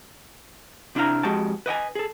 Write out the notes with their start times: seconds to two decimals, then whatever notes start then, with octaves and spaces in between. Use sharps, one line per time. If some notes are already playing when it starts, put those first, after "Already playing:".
0.95 C3 D4 E4 G4 F5 A#5
1.23 F2 G#3 F#4 G4 G5 A5
1.66 B4 D#5 G5 G#5
1.95 G#4 A4